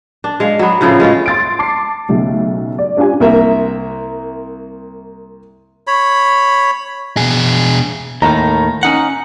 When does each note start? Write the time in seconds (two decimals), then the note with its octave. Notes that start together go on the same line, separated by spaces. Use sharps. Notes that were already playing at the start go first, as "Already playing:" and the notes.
0.24 D4
0.40 G#3 F5
0.59 F#3 B3
0.81 A2 C#3 F3 F4
1.00 G#3 C#4 F4
1.26 C6 A6 D7
1.59 A5 D6 C7
2.09 B1 C#3 A3
2.78 D5
2.97 C#4 D4 F4 G4 G#5
3.20 C2 A#3 E5
5.87 C#5 B5
7.17 B2 G#4
8.22 D#2 A2 D#3 A#5
8.83 C#4 D#4 F#5